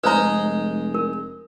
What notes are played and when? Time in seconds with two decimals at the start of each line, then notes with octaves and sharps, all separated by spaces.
0.04 F1 G#3 D#4 B4 C5 A#5
0.94 A#4